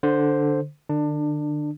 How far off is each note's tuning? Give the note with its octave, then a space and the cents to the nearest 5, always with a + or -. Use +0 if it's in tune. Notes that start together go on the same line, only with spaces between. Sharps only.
D3 +0 C5 +0
D3 +40 D4 +20